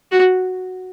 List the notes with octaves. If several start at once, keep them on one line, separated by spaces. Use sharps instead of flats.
F#4